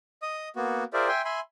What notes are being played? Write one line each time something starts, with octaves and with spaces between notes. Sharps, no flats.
D#5 D#6
A#3 B3 F#4
F4 G#4 A#4 C5 D5 E5
E5 G5 G#5 C6
E5 G#5 B5 C6